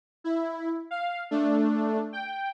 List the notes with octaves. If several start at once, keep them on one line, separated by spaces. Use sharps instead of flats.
E4
F5
A3 D4
G5